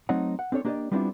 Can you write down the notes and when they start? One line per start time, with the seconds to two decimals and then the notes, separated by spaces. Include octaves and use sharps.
0.09 F#3 A3 C4 D#4 C#5 F#5
0.39 F#5
0.52 C4 D4 A4 C#5
0.65 A#3 D4 G4 C5 D5 D#5
0.92 G3 B3 C4 D4 E4 F4